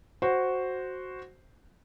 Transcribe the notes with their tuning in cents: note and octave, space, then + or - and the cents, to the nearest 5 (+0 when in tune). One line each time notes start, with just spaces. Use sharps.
F#4 +0 C5 +0